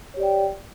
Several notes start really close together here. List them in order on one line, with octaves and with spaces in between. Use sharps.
C#5 G4 D5 G5